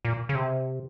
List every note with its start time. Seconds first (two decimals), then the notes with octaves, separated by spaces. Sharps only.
0.05 A#2
0.29 C#3
0.35 C3